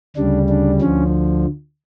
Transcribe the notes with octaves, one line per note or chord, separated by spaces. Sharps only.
D2 C#3 G3 D4
D4
D2 D3 F3 C#4